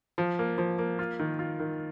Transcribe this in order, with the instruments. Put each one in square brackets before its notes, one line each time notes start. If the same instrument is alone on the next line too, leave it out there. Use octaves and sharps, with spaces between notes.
[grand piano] F3
A#3
F3
A#3
F4
D#3
F4
D#3